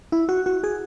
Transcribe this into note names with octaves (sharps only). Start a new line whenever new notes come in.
E4
F#4
F#4
G#4